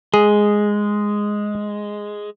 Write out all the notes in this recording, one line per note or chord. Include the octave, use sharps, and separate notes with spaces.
G#3 G#4